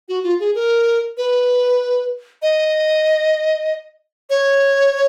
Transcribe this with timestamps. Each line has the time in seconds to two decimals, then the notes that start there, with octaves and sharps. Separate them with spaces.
0.09 F#4
0.23 F4
0.40 G#4
0.55 A#4
1.17 B4
2.42 D#5
4.30 C#5